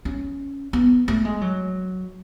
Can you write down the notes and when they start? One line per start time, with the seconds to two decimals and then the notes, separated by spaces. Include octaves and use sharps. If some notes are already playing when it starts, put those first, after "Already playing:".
0.05 C#4
0.73 B3
1.08 A3
1.25 G#3
1.41 F#3